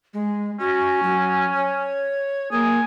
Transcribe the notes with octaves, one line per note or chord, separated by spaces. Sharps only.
G#3
C#4 F#4
F#3
C#5
A#3 G#4